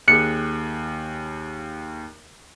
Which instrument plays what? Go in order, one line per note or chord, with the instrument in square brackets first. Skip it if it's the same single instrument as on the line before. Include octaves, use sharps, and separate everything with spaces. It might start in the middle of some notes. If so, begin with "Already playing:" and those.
[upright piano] D#2 G#4 [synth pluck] F#6 C#7